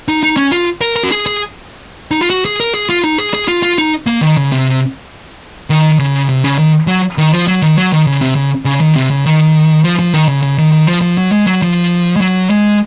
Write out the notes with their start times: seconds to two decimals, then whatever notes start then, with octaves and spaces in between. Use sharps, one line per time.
0.08 D#4
0.23 D#4
0.37 C#4
0.52 F4
0.81 A#4
0.96 A#4
1.03 F#4
1.12 G#4
1.26 G#4
2.11 D#4
2.21 F4
2.30 F#4
2.45 G#4
2.60 A#4
2.74 G#4
2.89 F4
3.04 D#4
3.18 G#4
3.34 G#4
3.48 F4
3.63 F4
3.78 D#4
4.07 A#3
4.21 D#3
4.37 C#3
4.52 C3
5.70 D#3
5.99 C#3
6.29 C3
6.44 C#3
6.58 D#3
6.88 F#3
7.18 D#3
7.32 F3
7.48 F#3
7.62 D#3
7.77 F#3
7.92 D#3
8.07 C#3
8.21 C3
8.36 C#3
8.65 C#3
8.81 D#3
8.96 C3
9.10 C#3
9.25 D#3
9.84 F3
9.99 F3
10.13 D#3
10.28 C#3
10.43 C#3
10.58 D#3
10.72 D#3
10.87 F3
11.02 F3
11.18 F#3
11.32 G#3
11.47 F#3
11.62 F3
12.16 G#3
12.21 F#3
12.50 G#3